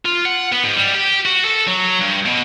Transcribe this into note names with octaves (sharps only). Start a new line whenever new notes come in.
F4
F#5
B3
G#2
G3
G4
F#4
A4
F#3
G2
B2